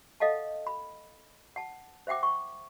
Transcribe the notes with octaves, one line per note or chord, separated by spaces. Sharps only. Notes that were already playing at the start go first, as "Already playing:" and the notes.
A4 D#5 F5 F#5 A5
B5
F#5 A5
C5 E5 F#5 G5 D6
C#6